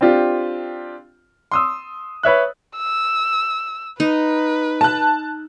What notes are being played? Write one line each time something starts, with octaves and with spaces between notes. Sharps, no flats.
C4 D4 F4 G4
C6 D#6 E6
B4 C#5 E5 F#6
E6
D#4 B4
A5 F#6